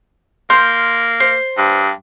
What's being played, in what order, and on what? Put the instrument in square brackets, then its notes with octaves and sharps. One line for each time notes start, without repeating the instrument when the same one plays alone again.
[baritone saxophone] A#3 [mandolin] C6 F6 G6
[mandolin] C5
[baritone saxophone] G2